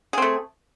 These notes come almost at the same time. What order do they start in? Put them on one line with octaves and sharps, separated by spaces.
G#4 C4 A3